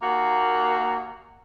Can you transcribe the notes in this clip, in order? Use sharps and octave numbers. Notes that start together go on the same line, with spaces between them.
D#2 A#3 F#4